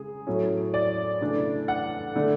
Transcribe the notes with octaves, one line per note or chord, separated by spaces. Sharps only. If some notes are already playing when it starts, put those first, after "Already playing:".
Already playing: C#3 G#3 G#4
A2 F#3 A3 C#4
D5
C#3 E3 A3 D4
F#5
D3 A3 D4